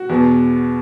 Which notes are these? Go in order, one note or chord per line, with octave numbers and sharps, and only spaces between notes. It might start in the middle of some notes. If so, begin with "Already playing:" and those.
Already playing: F#4
E2 B2 B3